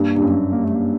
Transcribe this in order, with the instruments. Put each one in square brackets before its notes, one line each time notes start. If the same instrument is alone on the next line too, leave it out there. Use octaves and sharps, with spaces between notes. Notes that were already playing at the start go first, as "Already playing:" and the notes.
Already playing: [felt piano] G2 [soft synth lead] A#3
[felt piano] G2
F#2
[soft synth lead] A#3
A3
A#3